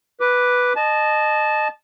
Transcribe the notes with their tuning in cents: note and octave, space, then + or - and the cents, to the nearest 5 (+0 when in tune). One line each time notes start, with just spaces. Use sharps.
B4 +0 D6 +0
D#5 -25 A5 -20